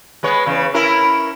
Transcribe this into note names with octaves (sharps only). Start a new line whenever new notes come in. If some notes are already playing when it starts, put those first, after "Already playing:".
G#3 B3 C#5
E2 C#3
C#4 E4 A#4